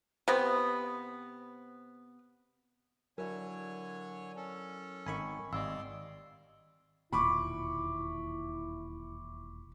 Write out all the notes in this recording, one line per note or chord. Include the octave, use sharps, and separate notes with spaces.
C3 B3
D3 F#3 E4 A#4 C#5 G#5
C#4 A4
G#1 D#3 G#5 B5 C#6
G#1 G3 D5 D#5 F5 C6 E6
E1 D#2 A#2 E4 B5 C#6 D6